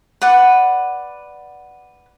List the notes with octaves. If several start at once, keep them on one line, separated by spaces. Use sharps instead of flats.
B4 D5 F#5